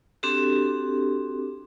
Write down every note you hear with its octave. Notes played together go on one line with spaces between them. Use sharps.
C4 D4 F#4 G4 A4